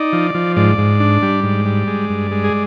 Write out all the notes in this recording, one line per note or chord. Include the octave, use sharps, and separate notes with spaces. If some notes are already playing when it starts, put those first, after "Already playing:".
Already playing: D#4 D5
F3
F3
G#2 D5
G#2
D4
G3
G#2
G3
G#3
G2
G#3
G#4